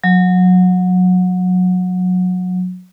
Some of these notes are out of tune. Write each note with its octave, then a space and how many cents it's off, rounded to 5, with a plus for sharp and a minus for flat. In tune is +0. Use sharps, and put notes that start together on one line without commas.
F#3 -25